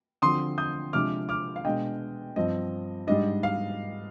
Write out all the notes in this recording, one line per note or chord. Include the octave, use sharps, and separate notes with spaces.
D3 F3 C4 C6 D#6
D#6 G6
C3 F3 G#3 D4 D6 F6
D6 F6
F5
B2 G#3 D4 D#5 G5
G2 F3 C4 D#5
G#2 G3 D4 D#5
F5